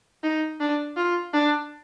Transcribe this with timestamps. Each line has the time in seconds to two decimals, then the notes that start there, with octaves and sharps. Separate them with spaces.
0.23 D#4
0.60 D4
0.97 F4
1.33 D4